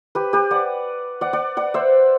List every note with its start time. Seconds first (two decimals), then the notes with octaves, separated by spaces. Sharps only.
0.15 G4 B4
0.33 G4 B4
0.51 D5 F#5
1.21 D5 F#5
1.33 D5 F#5
1.57 D5 F#5
1.74 C5 E5